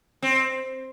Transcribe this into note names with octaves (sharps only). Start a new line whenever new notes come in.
C4